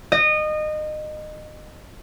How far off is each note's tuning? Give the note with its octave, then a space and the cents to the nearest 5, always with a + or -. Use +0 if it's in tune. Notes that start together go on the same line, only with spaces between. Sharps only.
D#5 -25